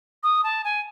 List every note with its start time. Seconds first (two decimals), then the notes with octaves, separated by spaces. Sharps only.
0.23 D#6
0.44 A5
0.64 G#5